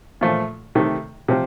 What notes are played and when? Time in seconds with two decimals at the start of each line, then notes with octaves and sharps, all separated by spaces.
0.21 A#2 F3 A3
0.75 C3 D#3 A3
1.28 C3 F3 C4